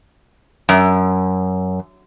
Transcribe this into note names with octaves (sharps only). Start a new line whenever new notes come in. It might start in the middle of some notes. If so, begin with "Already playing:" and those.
F#2